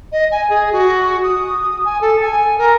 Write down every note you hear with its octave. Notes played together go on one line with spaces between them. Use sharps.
D#5
G#5
G#4
F#4
D#6
G#5
A4
G#5
A#4